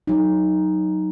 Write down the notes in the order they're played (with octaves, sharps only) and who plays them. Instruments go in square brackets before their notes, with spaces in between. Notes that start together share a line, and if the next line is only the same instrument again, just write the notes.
[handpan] F#3 D#4